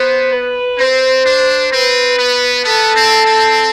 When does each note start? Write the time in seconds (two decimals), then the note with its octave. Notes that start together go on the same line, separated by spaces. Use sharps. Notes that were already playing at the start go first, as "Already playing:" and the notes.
Already playing: B3 C5
0.32 B4
0.79 C4 C5
1.26 D4
1.72 C4 B4
2.18 B3
2.64 B3 A4
2.96 C4
3.26 C4